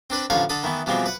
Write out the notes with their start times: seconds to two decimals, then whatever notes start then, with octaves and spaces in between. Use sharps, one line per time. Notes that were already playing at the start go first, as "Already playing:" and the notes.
0.10 C4 D4 B4 B5
0.30 A1 D3 F3 C#5 F5
0.49 D3 A4 B5 D#6
0.63 D#3 E3 A3 B3
0.86 B2 E3 F3 G3 G#3 C4
1.06 B4 F#5